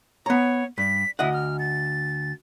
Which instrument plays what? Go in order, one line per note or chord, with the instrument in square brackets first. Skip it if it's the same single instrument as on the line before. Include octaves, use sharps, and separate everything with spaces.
[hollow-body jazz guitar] B3 A#5 [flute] C#5
[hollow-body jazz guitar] G2 [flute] B6
[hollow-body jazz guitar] D2 D#5 F#5 [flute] E4
[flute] F6
A6